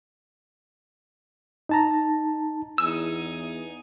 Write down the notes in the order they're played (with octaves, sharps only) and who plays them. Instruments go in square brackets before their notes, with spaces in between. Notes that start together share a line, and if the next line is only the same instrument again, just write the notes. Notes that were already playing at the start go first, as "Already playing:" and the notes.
[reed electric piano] D#4 A5 A#5
[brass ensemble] E2 [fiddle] D#4 G#5 [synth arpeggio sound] E6